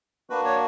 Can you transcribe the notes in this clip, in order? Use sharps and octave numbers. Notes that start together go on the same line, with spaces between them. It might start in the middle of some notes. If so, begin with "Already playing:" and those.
A#3 D4 F#4 B4
C#5